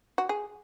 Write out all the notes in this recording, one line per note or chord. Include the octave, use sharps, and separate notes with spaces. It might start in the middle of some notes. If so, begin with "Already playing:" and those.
F#4
G#4